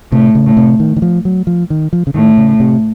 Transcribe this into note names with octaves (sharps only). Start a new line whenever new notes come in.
A2 C3
C#3
A2
C3
D#3
D#3
F3
F#3
F3
D#3
F3
C#3
A2 D#3
C#3
C3